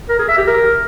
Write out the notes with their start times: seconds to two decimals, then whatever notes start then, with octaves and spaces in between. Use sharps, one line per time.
0.09 A#4
0.19 G#4
0.28 E5
0.38 G4
0.47 A#4